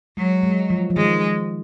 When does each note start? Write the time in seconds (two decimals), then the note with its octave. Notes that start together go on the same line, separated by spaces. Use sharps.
0.17 F#3 G#3
0.43 G#3
0.70 F3
0.90 F3
0.96 D#3 G#3